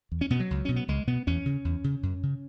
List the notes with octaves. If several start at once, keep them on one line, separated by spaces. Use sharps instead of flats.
E2
C#4
B2 B3
F#3
C#2
B2 C#4
B3
C#2 G#3
B2 B3
E2 C#4
C#3
E2
C#3
F#2
C#3